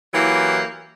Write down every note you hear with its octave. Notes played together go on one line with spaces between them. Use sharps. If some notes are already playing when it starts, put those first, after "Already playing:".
E3 F#3 A#3 E4 G4